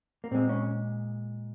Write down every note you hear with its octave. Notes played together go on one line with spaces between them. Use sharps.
A#3
A#2 G#3 C4
C#4